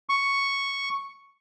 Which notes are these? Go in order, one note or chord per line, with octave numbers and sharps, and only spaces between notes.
C#6